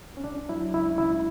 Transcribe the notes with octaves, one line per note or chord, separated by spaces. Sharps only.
C#4
C#2 D4
F#3 E4
C#2 E4
C#2 E4